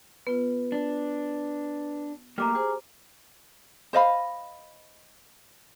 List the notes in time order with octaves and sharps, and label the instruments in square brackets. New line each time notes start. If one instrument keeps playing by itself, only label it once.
[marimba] B3 F4 [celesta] B4
[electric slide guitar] D4
[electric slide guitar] A3 A#3 G4 [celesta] A#5 D6 F6
[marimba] G4 C5 [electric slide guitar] G#4
[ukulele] C5 D#5 F5 B5